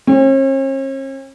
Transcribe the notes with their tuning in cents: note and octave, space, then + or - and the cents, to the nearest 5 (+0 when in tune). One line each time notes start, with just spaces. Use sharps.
C#4 -45